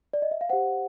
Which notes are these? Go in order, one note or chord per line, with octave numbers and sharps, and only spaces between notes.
D5
D#5
E5
F5
G4 C5 F#5